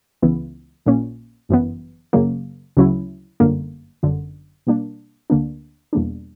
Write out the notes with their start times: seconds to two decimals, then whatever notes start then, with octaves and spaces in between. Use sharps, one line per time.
0.22 C#2 C#3 E3 B3 E4
0.86 A#1 A#2 A#3 C#4
1.49 G1 F#2 E3 B3
2.13 F#2 C#3 F#3 A#3
2.77 D2 C#3 F#3 C#4 E4
3.40 G1 F#2 D3 A#3
4.03 G1 F#2 D3
4.67 B2 G3 A#3 D4
5.30 D2 D3 A#3 D4
5.93 E2 B2 G3 A#3 D4